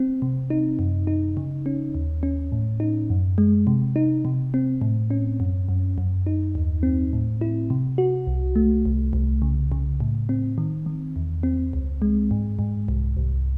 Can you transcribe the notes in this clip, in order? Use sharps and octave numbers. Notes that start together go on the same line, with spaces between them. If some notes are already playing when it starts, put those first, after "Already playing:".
Already playing: C4
C3
D#4
F#2
D#4
C#3
C#4
D#2
C#4
A2
D#4
F#2
G#3
C3
D#4
C3
C4
A2
C#4
F#2
F#2
F#2
D#4
D#2
C4
A2
E4
C3
F#4
C2
A3
C2
C2
C#3
C#3
A2
C4
D#3
D#3
E2
C4
C#2
G#3
G#2
G#2
C2
C2